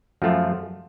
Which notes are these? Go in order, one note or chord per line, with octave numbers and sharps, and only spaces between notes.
F#2 F3 A3 F4